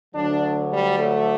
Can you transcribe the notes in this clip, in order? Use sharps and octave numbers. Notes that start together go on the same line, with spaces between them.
D2 D3 F#3 D4
G3
A3